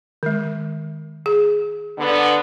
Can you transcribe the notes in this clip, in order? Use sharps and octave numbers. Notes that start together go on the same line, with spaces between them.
D#3 G#3
G#4
D3 B3